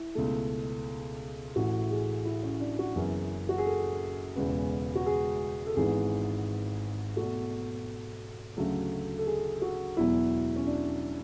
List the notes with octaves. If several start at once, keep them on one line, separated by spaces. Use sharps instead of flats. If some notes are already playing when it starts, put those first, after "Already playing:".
Already playing: E4
C#2 B2 A3
A1 A2 E3 F#4
G#4
E4
C#4
D4
F#4
F#1 F#2 E3 B3 G#4
F#4
G#4
A4
E1 E2 C#3 G#3 B3
F#4
G#4
A4
G#1 G#2 E3 B3 G#4
E2 B2 A3 F#4
D2 C#3 F#3 A3 A4
A4
G#4
F#4
E1 E2 B2 F#3 E4
C#4
D4